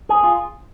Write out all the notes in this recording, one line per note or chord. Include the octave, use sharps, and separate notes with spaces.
G#4
F4